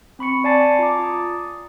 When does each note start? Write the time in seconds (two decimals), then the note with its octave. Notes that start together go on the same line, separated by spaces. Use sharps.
0.19 C4 B5 C#6 C#7
0.44 D5 G#5 A5 A6 C7 C#7
0.79 F4 A#5 D6
1.04 D#6